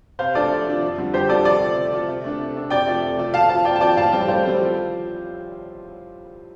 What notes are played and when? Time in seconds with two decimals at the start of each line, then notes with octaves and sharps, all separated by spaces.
0.19 C3 C5 F5
0.35 F3 A3 D4 F4 A4 D5
0.50 C3
0.66 F3 A3 D4 F4
0.82 F2
0.98 D3 G3 F4
1.14 F2 G4 C5
1.29 D3 G3 F4 A4 D5
1.45 C3 A4 D5
1.61 A3 C4 F4
1.76 C3
1.92 A3 C4 F4
2.08 C3
2.24 A3 D4 A4
2.40 C3
2.55 A3 D4 A4
2.70 F2 D5 G5
2.87 C3 A3 F4 A4
3.02 F2
3.18 C3 A3 F4 A4
3.34 F3 F5 A5
3.49 C4 F4 F5 A5
3.65 F3 D5 G5
3.76 A5
3.81 C4 F4 D5 G5
3.97 A2 F5 A5
4.12 G3 C4 A4 D5 G5
4.28 A2 C5 F5
4.44 G3 C4 A4
4.60 F3